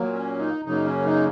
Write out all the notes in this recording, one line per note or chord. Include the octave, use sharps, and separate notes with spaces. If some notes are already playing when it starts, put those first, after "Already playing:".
Already playing: A#2 F#3 A#3
C#4
D#4
F#2 C#3 F#3 A#3 D#4
C#4
D#4